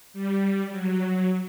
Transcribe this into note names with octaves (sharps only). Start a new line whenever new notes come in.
G3
F#3